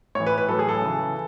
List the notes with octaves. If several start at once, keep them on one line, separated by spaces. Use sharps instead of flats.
A2 E3 C#5
B4
B4
A2 F#3 A4
G#4
A4
C#3 E3